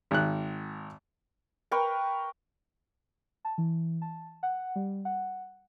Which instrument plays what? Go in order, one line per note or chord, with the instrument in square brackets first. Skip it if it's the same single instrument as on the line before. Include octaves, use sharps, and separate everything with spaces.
[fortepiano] G#1 F#6
[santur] A#4 B4 G5 C#6
[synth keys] A5
E3
A5
F#5
G3
F#5